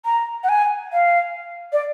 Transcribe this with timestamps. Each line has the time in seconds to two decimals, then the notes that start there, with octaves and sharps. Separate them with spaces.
0.05 A#5
0.44 F#5
0.49 G#5
0.93 F5
1.73 D5